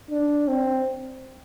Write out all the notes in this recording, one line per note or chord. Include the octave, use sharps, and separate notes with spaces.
D4
C4